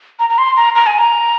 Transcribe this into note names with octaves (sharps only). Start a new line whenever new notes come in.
A#5
A#5
C6
A#5
A#5
G#5
A#5